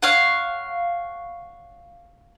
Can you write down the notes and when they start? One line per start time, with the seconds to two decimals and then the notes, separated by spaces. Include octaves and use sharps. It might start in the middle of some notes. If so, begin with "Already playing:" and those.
0.02 C#5 F5 F#5